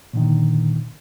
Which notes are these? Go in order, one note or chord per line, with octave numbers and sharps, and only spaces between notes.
A#2 D3 D#3